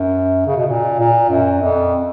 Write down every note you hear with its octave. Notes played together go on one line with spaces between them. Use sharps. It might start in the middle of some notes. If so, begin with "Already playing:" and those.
Already playing: F#2
C#3
B2
A#2
A#2
F#2
F2